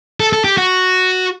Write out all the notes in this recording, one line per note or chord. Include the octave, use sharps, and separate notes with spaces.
A4
A4
G4
F#4